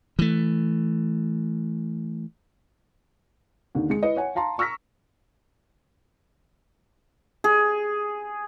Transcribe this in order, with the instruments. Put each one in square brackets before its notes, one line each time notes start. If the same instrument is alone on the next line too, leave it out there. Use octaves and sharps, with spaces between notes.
[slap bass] E3 A3
[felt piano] D#2 D3
G#3 C#7
E4 B4 D#5
C#5 F#5 G#5
F5 A5 A#5 C6
A#5 C#6 E6 F6 A#6 B6
[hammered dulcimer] G#4